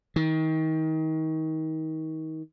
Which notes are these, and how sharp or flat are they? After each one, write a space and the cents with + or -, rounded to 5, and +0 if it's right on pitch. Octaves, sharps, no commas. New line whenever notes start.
D#3 +30